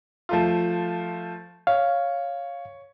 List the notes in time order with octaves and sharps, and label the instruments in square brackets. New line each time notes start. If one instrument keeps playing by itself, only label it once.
[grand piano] F3 A3 F4
[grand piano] C#5 [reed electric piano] F5